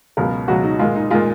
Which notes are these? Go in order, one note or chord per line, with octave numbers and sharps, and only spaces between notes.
C#2 B2 F#3 A#4
C#2 B2 F#3 F#4
D#4
A#2 G#3 F4
D#4
A#2 G#3 F4